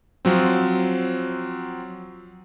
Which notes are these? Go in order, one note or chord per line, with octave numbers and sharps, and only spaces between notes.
F3 F#3 C4